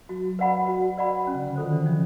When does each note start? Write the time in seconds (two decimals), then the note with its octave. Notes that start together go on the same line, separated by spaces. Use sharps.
0.09 F#3 F#4
0.39 B4 D5 F#5 B5
0.68 F#4
0.97 B4 D5 F#5 B5
1.27 C#4
1.35 C#3
1.47 D3
1.56 D#3 F4 A4 C5
1.73 E3
1.85 F3 C#4